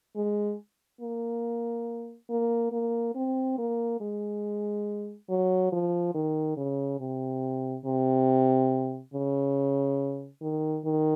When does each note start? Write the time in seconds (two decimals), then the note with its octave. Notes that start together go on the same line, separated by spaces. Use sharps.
0.16 G#3
1.01 A#3
2.30 A#3
2.72 A#3
3.16 C4
3.58 A#3
4.01 G#3
5.29 F#3
5.72 F3
6.15 D#3
6.57 C#3
7.00 C3
7.86 C3
9.14 C#3
10.42 D#3
10.85 D#3